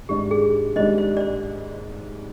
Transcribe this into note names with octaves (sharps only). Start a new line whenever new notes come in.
G#1 G#2 G3 D4 G4
G#4
G#1 G#2 G3 D4 C5 D#5
C5
D5
C5